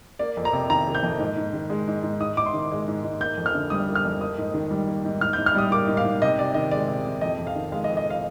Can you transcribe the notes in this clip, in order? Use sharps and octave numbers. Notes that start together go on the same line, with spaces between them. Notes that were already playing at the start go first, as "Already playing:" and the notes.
A#3 D5
F2
A#5
C3
D#3 A#5
A#3
G6
F2
G#2
G#2
D#3
G#3
G#2
G#2
G#2 D#6
G#2 D6
C6
D#3
G#3
G#2
G#2
A#3 G6
F2
F6
D3
G3 D#6
A#3
F6
F2
A#3 D#6
G#2
D#3
G3
A#3
G#2
G#2 F6
G#2 G6
F6
G3 D#6
A#3 D6
G#2
F5
G#2
C3 D#5
C3 D5
D#3 D#5
G#3 D5
C3
C3
F2 D#5
F2
F5
D#3
G#3 F5
D#5
F2
D#5
F5